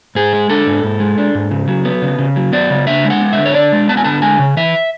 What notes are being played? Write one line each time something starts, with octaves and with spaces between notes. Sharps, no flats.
G#2 G#4
G#3
D4 A4
G#2
G#2
G#3
D4
G#2
C#3
F#3
B3
C#3
C#3
F#3
B3 D5
C#3
D4 E5
G#3
F#5
B3
D3 E5
C#5
D4 D5
G#3
B3 A5
G#5
D3 A5
G#3 G#5
C#3
E3 E5